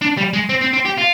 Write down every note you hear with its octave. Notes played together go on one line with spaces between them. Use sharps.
D4
G3
G#3
C4
C4
C4
G4
F4